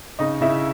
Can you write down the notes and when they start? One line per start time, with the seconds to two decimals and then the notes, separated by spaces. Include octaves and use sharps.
0.19 C#3 D#4 D#5
0.41 C#3 E4 E5